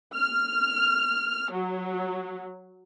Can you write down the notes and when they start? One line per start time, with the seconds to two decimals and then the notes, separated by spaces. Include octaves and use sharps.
0.14 F6
1.51 F#3